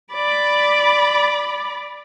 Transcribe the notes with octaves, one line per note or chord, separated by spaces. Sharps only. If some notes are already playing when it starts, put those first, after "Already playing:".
D5 B5